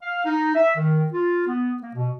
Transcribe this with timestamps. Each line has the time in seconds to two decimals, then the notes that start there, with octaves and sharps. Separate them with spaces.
0.01 F5
0.25 D#4
0.55 E5
0.76 D#3
1.12 F4
1.47 B3
1.81 A#3
1.94 B2